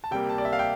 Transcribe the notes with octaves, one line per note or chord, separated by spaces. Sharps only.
A5
C3 G3 A#3 G5
A5
D5
E5
F5
G5